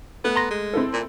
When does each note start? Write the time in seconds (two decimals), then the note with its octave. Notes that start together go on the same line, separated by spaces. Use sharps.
0.25 A3 B3 F#6
0.36 A#5 C6 A#6
0.51 G#3
0.73 C4 E4 A4
0.93 A#2